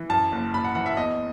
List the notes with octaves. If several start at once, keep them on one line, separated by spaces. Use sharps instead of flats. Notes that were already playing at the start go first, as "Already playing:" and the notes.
Already playing: E3
F#2 A5
F#1
F#1 B5
F#5
E3 F#5
E5
E2 D#5